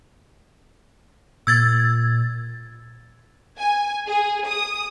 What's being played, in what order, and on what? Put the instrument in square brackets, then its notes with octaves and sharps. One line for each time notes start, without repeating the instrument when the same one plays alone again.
[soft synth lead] A#2 [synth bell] E6 G#6 A6
[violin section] G#5
G#4
D#6